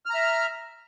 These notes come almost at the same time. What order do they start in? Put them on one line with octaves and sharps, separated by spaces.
F6 A#5 E5